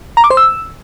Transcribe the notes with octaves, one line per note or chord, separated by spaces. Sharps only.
A#5
D6
C5
E6